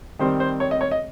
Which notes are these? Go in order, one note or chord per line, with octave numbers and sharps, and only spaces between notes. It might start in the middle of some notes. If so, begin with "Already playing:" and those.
D#3 G3 C4 C5
C5
C#5
D#5
C#5
D#5